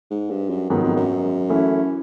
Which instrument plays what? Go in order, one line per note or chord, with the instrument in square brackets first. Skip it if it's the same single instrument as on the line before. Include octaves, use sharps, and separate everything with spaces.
[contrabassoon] G#2
G2
F#2
[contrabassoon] F2 [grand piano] G#2 D#3 F#3 B3
[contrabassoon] F2
F#2
[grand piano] E3 A3 C#4 E4 A4